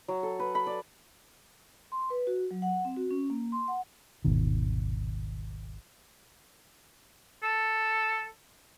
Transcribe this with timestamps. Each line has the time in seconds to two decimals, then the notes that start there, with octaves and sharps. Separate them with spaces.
0.08 F#3
0.23 A4
0.39 B4
0.55 B5
0.67 D5
1.92 C6
2.10 B4
2.27 F#4
2.51 F#3
2.62 F#5
2.85 C4
2.96 F#4
3.11 C#4
3.30 A#3
3.52 C6
3.68 F#5
4.25 D#1 G#1 B2 D#3
7.43 A4